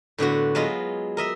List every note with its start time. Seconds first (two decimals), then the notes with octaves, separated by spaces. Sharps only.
0.18 A2 D3 B3 F#4
0.55 F#3 G#3 B3 F4 D#5
1.17 A#4 D#5 E5